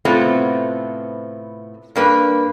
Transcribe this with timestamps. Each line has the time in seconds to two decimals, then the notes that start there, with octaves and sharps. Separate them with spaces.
0.05 A2 C3 A3 B3 C4 F4
1.96 G2 A#3 B4